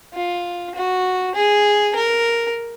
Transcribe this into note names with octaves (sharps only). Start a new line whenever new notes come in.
F4
F#4
G#4
A#4